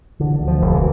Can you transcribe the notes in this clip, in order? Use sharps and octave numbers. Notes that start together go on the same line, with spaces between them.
D3 E3
D2
F3
E1
E3